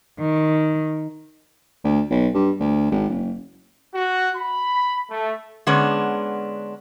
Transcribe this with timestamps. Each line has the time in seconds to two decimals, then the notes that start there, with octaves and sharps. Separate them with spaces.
0.17 D#3
1.84 D2
2.11 B1
2.34 G2
2.60 D2
2.92 G#1
3.09 F#1
3.95 F#4
4.37 B5
5.10 A3
5.67 D3 G#3 B3 C#4 D4